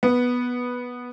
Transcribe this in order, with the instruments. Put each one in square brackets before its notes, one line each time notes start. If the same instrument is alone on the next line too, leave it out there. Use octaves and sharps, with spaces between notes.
[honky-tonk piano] B3